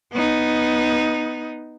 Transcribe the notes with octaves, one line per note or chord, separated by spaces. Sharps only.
B3 D#4